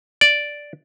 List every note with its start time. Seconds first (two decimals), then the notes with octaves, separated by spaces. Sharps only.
0.21 D5